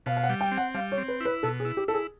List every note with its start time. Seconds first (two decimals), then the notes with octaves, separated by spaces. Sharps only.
0.06 B2 F5
0.17 F5
0.23 F#5
0.29 G3
0.41 G5
0.51 C4
0.58 F#5
0.74 G3 F5
0.92 C#5
0.98 C4
1.08 B4
1.20 E4 B4
1.43 B2 A4
1.60 G#4
1.65 E4
1.77 G4
1.88 E4 A4
1.94 G#4